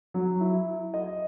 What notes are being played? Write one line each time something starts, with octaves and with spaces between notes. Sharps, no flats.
F#3
E4
D#5